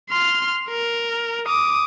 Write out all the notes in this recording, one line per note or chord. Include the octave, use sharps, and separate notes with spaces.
C6 F6
A#4
D6 D#6